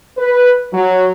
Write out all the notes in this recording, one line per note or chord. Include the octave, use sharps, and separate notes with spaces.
B4
F#3